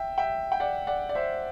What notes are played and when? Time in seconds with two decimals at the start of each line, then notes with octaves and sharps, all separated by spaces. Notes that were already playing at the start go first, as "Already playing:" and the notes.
Already playing: E5 G5
0.18 E5 G5
0.52 G5
0.60 D5 F#5
0.87 D5 F#5
1.09 D5
1.15 C5 E5